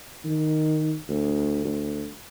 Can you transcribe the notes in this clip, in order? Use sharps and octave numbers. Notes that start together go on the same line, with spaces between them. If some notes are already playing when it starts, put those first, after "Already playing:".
D#3
D2
D2